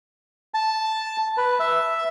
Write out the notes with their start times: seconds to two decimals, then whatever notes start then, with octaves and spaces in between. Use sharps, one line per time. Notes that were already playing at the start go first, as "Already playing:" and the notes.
0.54 A5
1.37 B4
1.60 E5